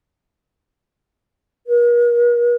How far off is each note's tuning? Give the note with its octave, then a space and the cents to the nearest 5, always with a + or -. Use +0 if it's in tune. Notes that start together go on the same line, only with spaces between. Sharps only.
A#4 +45